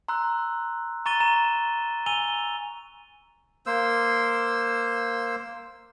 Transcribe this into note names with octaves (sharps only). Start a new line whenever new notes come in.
A#5 C6 E6 F#6
A#5 C#6 A6 D#7 G7
A#5 D#7 E7
G#5 E6 D#7 F7 G7
A#3 C5 E6